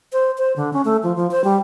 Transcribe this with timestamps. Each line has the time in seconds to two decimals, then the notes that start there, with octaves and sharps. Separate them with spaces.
0.13 C5
0.38 C5
0.56 D3
0.73 C#4
0.85 A3
1.03 F3
1.16 F3
1.31 C5
1.44 G3